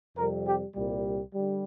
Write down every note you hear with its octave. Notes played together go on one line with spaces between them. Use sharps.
F2 C3 G3 A#4
G4
C2 A#2 G3
D3 G3